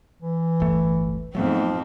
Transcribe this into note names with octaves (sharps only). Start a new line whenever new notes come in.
E3
D1 G1 A3
F2 G#2 F3 F#3 A3 B3 C4